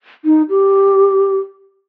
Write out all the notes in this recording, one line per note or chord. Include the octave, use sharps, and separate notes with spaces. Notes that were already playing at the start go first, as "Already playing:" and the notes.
D#4
G4